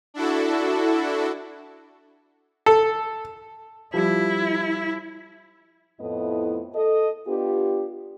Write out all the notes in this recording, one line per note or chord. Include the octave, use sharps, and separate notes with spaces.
D4 E4 F#4 A4
A4
F3 G3 E4
F2 A2 A3 B3 E4 D#5
A4 D#5
B3 D4 F4 G4